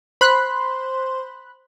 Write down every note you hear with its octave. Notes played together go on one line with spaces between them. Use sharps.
C5 B5 C6 F#6